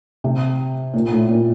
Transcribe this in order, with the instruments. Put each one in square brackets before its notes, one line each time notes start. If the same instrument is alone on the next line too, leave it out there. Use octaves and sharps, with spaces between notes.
[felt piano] C3
A#2
A2
A#2